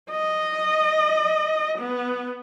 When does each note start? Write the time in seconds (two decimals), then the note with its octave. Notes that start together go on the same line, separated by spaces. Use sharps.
0.11 D#5
1.78 B3